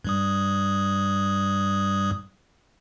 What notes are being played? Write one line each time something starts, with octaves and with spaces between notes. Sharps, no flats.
G2 G3 D#6